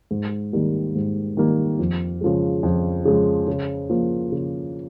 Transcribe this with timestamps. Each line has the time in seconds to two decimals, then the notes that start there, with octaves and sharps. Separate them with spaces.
0.11 G#2
0.53 D#3 G3 A#3
0.95 G#2
1.37 D#3 G3 A#3
1.79 F2
2.21 C#3 F3 G#3
2.63 F2
3.05 C#3 F3 G#3
3.47 C#3
3.90 F3 A#3
4.32 C#3